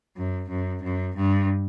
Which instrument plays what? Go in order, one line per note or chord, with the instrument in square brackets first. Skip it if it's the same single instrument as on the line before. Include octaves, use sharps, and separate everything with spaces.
[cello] F#2
F#2
F#2
G2